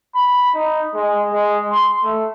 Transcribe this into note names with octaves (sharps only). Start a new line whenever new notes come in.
B5
D#4
G#3
G#3
C6
A3